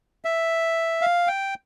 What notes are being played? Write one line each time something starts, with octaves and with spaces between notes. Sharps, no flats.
E5
F5
G5